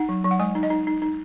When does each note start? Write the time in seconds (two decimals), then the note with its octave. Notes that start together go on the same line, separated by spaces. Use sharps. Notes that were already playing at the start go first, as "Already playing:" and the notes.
Already playing: D#4 F#5
0.09 F#3
0.24 F#3
0.31 F#5
0.39 G#3 G#5
0.55 D#4
0.63 D#5
0.70 D#4
0.87 D#4
1.02 D#4